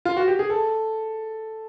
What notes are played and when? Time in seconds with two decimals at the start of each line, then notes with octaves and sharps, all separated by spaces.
0.05 F4
0.17 F#4
0.28 G4
0.39 G#4
0.50 A4